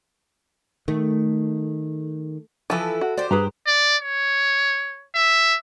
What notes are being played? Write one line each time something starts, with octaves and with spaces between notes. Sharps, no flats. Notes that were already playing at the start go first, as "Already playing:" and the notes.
D#3 A3
E3 F3 E4 A4
F#4
G4 C5 D5
G2 G#4 B4 A#5
D5
C#5
E5